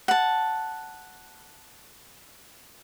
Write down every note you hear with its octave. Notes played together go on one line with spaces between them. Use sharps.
F#5 A5